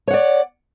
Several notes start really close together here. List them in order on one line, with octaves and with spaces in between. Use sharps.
C#5 F#5 D5